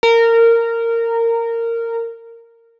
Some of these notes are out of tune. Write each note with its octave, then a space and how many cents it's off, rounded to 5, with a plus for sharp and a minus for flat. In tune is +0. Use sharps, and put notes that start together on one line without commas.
A#4 -15